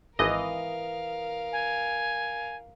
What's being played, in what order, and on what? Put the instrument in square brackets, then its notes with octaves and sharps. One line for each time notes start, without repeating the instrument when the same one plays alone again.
[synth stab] G#1 D#5 [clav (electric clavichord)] E3 [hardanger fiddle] A#4 F5
[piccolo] G#5